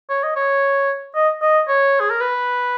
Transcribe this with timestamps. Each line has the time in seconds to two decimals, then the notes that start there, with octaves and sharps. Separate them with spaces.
0.10 C#5
0.23 D#5
0.36 C#5
1.15 D#5
1.42 D#5
1.68 C#5
2.00 G#4
2.10 A#4
2.20 B4